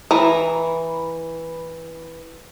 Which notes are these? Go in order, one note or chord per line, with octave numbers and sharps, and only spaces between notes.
E3 E4 A#5